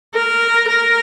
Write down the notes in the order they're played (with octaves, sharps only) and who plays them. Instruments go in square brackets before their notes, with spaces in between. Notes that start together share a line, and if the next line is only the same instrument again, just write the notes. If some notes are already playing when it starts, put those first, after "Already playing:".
[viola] A#4
A#4